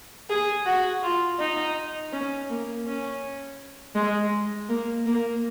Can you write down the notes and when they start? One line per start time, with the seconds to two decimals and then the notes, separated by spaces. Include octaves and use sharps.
0.30 G#4
0.66 F#4
1.03 F4
1.40 D#4
2.13 C#4
2.50 A#3
2.87 C#4
3.95 G#3
4.69 A#3
5.06 A#3